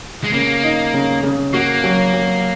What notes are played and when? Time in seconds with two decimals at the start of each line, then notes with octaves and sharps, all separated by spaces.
0.24 G#3
0.33 C#3 A#3
0.63 D#4
0.94 C#3
1.23 C#3
1.53 A#3 F#4
1.84 F#3
2.14 F#3